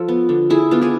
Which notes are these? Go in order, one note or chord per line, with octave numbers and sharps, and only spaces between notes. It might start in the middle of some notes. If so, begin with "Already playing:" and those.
Already playing: F3 F4 A4
B3
D3
D3 E4 G#4
B3 D4 F4
E4 G#4